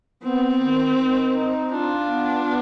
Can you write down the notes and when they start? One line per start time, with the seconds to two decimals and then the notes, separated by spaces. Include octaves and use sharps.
0.23 B3 C4
0.60 D#3
0.97 D#3
1.34 D#4
1.71 D4 F4
2.08 B3
2.45 B3